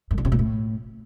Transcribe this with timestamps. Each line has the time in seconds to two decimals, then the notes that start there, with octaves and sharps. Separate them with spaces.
0.11 G2
0.18 D3
0.25 C3
0.32 A#2
0.39 A2